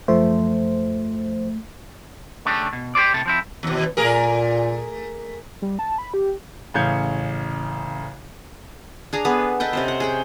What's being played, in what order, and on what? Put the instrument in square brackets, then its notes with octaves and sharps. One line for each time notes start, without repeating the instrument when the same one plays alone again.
[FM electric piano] F#2 F3 C5 [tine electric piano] A3
[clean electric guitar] C#3 A3 D4 G4
B2
G4 A4 C5 D5
A2 C3 A4
F3 C4 E4
[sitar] D#2 B2
[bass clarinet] A#2 [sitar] A3 G#4 A#4
[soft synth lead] G3
A5
B5
G4
[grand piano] A1 C#3 F5 G6 G#6 C#7
[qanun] D4 G#4 A#5
B3 G#4 A4 B4
A4 B4 D#5 G5
C3 C#4 C5
F#5
G#4 F#5 G5